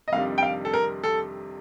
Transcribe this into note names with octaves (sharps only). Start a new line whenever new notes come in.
D#5
F2 C3 D#3 G3 D4 F5
G5
F5
A4
A#4
A4